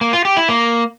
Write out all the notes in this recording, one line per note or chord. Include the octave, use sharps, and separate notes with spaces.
A#3
F4
G4
E4
A#3